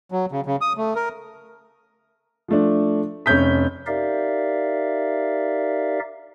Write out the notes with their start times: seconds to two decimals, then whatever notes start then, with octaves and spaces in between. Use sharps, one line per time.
0.12 F#3
0.32 C#3
0.46 C#3
0.61 D#6
0.77 A3
0.96 A#4
2.48 F3 A3 D4
3.26 F1 C#4 G6 B6
3.87 D#4 G4 A#4 D5 E5 F5